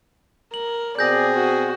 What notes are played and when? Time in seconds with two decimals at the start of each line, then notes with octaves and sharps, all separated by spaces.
0.54 A#4 F#7
0.99 B2 C4 G#4 D5 G6 A#6
1.35 F#4